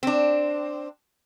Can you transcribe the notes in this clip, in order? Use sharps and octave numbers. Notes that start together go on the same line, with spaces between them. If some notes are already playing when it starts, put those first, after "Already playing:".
C4 D4